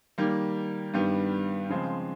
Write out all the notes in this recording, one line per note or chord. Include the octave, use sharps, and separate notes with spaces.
D#3 G3 A#3
G2 D#3 G3 B3
C#3 F3 G#3 C4